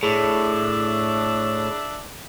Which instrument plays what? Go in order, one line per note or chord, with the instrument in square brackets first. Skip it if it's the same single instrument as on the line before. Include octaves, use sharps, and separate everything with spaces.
[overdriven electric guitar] A2 [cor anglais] D4 [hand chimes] G#4 [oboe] E5